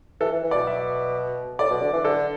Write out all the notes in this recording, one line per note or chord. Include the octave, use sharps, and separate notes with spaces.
E3 A4
E3
E3
D5
B2
E5
A2 D5
B2
D3
E3
D3 A4